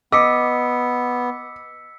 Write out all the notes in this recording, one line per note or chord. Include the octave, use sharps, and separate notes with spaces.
B3 D#5 D6 E6 B6 C#7